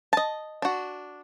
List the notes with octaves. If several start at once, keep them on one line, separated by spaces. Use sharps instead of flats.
D#5 A5
D4 F#4